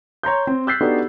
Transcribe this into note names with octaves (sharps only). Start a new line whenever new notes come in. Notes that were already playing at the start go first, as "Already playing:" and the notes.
C#5 A#5 C6 G6
C4
E6 F#6 G6 A6 B6 C7
B3 D4 D#4 F#4 G4 A4